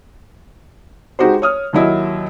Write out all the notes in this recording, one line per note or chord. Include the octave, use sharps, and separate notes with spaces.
G#3 D#4 F#4 G4 C5
C#5 D#6 F6
D#2 F#3 E4 D#5